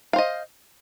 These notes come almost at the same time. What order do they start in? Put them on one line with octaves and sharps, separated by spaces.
F5 C5 D#5